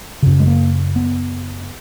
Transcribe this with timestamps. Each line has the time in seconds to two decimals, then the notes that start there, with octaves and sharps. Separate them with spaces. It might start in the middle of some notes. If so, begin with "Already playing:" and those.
0.23 F#2 C#3
0.40 G#3
0.47 A#3
0.96 B3